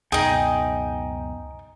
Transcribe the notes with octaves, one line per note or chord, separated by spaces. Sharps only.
C#2 F#2 B2 D#4 G#4 G5